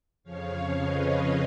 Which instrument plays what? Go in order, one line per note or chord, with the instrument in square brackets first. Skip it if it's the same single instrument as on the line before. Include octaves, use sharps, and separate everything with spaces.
[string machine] F2 C#3 F3 C#5 F5
B4 D#5